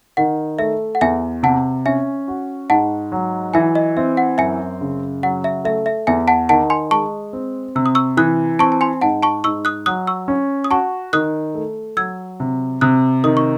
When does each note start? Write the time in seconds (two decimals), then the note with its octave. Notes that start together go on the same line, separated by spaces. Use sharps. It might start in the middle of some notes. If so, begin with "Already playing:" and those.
0.17 D#3 F#5
0.59 A3 E5
0.95 F#5
1.01 E2 E5 G#5
1.43 C3 F#5 A5
1.86 C#4 E5 G#5
2.28 F#4
2.69 G#2 F#5 A5
3.12 F#3
3.54 E3 E5 G#5
3.75 D#5
3.97 C4 E5
4.17 F#5
4.38 F#2 E5 G#5
4.81 C#3
5.23 F#3 F#5
5.44 E5
5.65 A3 E5
5.86 E5
6.07 E2 E5 G#5
6.28 F#5 A5
6.49 D#3 F#5 A5
6.70 G#5 C6
6.91 G#3 A5 C#6
7.33 C4
7.76 C3 E6
7.86 D#6
7.95 C#6 E6
8.17 E3 D#6 F#6
8.59 C4 A5 C#6
8.72 A5
8.81 G#5 C6
9.01 G#2 F#5 A5
9.23 A5 C#6
9.44 G#2 C#6 E6
9.65 D#6 F#6
9.86 F#3 D#6 F#6
10.07 C#6 E6
10.28 C#4
10.64 D#6
10.71 F#4 A5 C#6
11.13 D#3 D#6 F#6
11.55 A3
11.97 F#3 E6 G#6
12.40 C3
12.81 C3 D#6 F#6
13.24 D#3 D#6
13.37 C#6